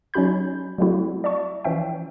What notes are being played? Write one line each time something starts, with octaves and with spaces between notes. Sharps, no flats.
F#3 C#4 D#4 F#4 B5 G6
F#3 G3 A3 C4 E4 F#4
D5 E5 A5 C#6
E3 F3 C#4 E5 G5